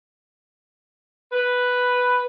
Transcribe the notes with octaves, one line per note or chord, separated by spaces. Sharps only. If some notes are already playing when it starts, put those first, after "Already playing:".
B4